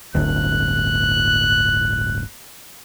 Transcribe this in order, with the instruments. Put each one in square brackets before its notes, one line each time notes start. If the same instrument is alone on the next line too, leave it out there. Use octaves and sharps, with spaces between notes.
[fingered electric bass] D1 G1 [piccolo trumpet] F#6